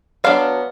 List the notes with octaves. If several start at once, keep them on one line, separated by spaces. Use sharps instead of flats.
F#3 B3 D4 F5